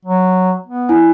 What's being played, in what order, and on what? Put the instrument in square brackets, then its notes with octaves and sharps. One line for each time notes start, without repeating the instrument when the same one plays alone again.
[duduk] F#3
B3
[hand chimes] D4 E4 G#5